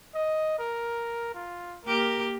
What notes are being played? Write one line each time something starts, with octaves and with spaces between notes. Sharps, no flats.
D#5
A#4
F4
A#3 G4 A#4